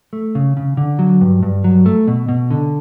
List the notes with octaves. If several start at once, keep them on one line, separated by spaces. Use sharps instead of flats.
A3
C#3
C#3
D3
F#3
G2
G2
F#3
A3
B2
B2
D3